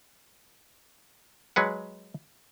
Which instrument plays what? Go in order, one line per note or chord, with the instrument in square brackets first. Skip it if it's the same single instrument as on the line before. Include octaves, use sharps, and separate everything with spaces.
[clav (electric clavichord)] F#3 G#3 B4 F#5